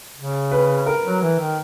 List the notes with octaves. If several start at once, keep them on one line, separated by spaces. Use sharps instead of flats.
C#3
B4
A#4
F#3
E3
D#3